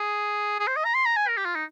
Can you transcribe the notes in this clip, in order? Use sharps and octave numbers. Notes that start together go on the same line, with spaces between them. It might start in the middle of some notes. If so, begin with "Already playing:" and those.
Already playing: G#4
G#4
C5
D#5
A#5
C6
A#5
G#5
A#4
G4
F4
D#4